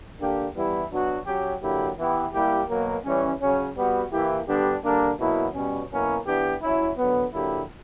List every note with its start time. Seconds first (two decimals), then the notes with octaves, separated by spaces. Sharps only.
0.19 D3 A#3 D4 G4
0.54 E3 G3 B3 E4 G4
0.91 F#3 B3 D4 F#4
1.26 F#3 C#4 G4
1.62 D3 F#3 A#3 E4 G4
1.97 E3 B3 E4 G4
2.34 G3 A#3 E4 G4
2.69 B2 F#3 A#3
3.04 E3 G3 C#4
3.41 C#3 F#3 C#4
3.75 G3 B3 F#4
4.11 E3 A#3 E4 G4
4.47 D3 G3 B3 D4 G4
4.83 D3 G3 A#3 D4
5.19 B2 F#3 A#3 E4
5.54 B2 G3 C#4
5.90 B2 F#3 A#3 C#4 E4
6.26 E3 B3 D4 G4
6.62 F#3 C#4 E4
6.97 D3 F#3 B3
7.33 D3 F#3 A#3 E4 G4